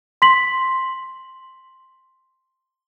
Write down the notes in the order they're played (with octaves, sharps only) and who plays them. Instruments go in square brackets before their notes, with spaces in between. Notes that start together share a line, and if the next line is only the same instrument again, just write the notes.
[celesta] C6 B6 F#7